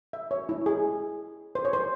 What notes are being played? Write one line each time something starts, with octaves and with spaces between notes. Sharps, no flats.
E5
C#5
E4
G#4
C5
C#5
C5